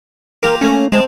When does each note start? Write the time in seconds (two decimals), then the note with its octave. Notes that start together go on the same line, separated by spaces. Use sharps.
0.43 A#3 F4 G4 A#4
0.61 A3 A#3 C#4
0.92 C3 G#3 C4 A5